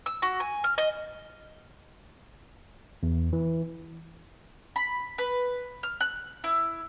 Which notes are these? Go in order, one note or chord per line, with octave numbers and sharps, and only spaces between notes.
E6
F#4
G#5
F6
D#5
E2
E3
B5
B4
F6
F#6
E4